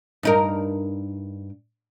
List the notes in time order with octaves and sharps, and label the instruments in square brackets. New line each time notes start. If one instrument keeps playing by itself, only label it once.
[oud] G2 D#4 A#4